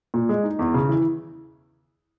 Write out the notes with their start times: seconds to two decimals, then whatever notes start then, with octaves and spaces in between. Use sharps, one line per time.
0.14 A#2
0.29 G#3
0.44 D#4
0.59 E2
0.74 C#3
0.89 E3